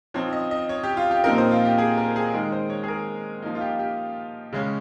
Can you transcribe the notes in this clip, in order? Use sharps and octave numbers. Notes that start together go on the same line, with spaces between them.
F3 C4 D#4 C#5
D#5
D#5
C#5
G4
F4
G4
A#2 F3 C4 D#4 A#4
C5
F4
G4
G#4
A#4
G#4
D#3 G#3 D#4 A#4
C5
C#5
G#4
A#4
F3 A#3 D#4
F4
G4
G4
C#3 G#3 C#4